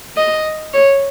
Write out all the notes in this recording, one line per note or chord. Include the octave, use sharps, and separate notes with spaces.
D#5
C#5